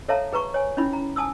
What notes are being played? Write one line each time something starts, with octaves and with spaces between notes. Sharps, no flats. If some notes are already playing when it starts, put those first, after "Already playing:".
A4 C#5 E5 F5 A5 A#5
G#4 B4 A#5 C#6
C#5 G#5
C#4 D#4 E4 B5
A#5
G#5 A5 D#6 E6